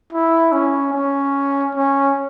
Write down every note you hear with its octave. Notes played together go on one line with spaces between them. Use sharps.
E4
C#4
C#4
C#4